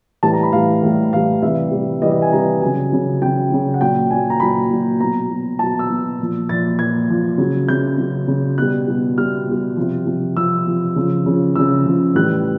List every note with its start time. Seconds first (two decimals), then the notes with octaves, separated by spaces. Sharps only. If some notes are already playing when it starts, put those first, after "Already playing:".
0.23 A2 E3 G3 A5
0.34 A#5
0.43 B5
0.52 A2 E3 G3 F5
0.83 A2 E3 G3
1.13 A2 E3 G3 F5
1.42 C3 E3 G3 E5
1.72 C3 E3 G3
2.01 C3 E3 G3 D#5
2.11 D#5
2.22 G#5
2.32 C3 E3 G3 A#5
2.62 C#3 F#3 G#5
2.92 C#3 F#3
3.21 C#3 F#3 G5
3.51 C#3 F#3
3.74 F#5
3.81 A#2 F#3 G5
4.10 A#2 F#3 G#5
4.30 A#5
4.40 A#2 F#3 B5
4.70 A#2 F#3
4.99 B2 F#3 A#5
5.30 B2 F#3
5.59 B2 F#3 A5
5.79 E6
5.90 B2 F#3
6.19 A#2 F3
6.49 A#2 F3 A6
6.79 A#2 F3 G#6
7.09 A#2 F3
7.38 C#3 F#3
7.68 C#3 F#3 G6
7.98 C#3 F#3
8.28 C#3 F#3
8.58 B2 G3 F#6
8.88 B2 G3
9.18 B2 G3 F6
9.47 B2 G3
9.77 C3 F3
10.07 C3 F3
10.37 C3 F3 E6
10.67 C3 F3
10.96 C#3 F3
11.26 C#3 F3
11.55 C#3 F3 E6
11.86 C#3 F3
12.15 A2 E3 G3 F#6